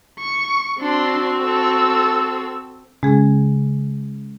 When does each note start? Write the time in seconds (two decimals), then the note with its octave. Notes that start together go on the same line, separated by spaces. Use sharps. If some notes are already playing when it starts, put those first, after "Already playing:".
0.19 C#6
0.81 C4 D4 F#4 C6
1.43 A4 E6
3.03 C#3 G#3 G#4